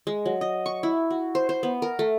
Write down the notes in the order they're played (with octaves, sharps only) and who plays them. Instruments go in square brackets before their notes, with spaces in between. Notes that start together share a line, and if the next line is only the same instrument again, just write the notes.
[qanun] G#3
F#3
D#5
C#6
E4
F#4
C5
C5
B3
A#4
A3